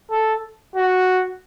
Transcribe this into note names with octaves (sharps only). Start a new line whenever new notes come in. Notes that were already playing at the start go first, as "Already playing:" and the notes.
A4
F#4